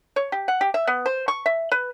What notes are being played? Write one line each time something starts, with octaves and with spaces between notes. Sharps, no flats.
C#5
G4
F#5
G4
E5
B3
C5
C#6
E5
B4